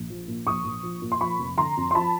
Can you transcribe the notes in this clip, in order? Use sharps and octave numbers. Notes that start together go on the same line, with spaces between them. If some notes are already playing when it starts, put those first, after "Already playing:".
Already playing: A#1
F3
A#2
A#1 C#6 D#6
A#1
F3
A#2
C6
F3 B5 C#6
F1
D3 A#5 C6
F2
C6
F3 A5 B5